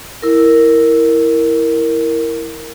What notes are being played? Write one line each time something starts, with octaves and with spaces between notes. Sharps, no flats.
E4 A#4